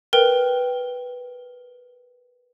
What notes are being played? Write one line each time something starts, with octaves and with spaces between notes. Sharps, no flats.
A#4 B4 G5